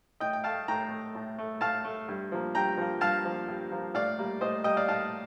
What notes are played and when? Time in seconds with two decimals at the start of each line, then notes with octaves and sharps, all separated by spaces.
0.20 A2 D#5 G5
0.33 G5
0.44 A3 F5 A5
0.68 A2 G5 A#5
0.91 A3
1.15 A2
1.38 A3
1.61 A2 F5 A5
1.85 A3
2.08 G2
2.32 F3 A#3
2.55 G2 G5 A#5
2.77 F3 A#3
3.01 G2 F5 A5
3.25 F3 A#3
3.48 G2
3.72 F3 A#3
3.94 A2 D5 F5
4.19 G3 A#3
4.41 A2 C5 D#5
4.64 G3 A#3 D#5 G5
4.77 D5 F5
4.88 A2 F5 A5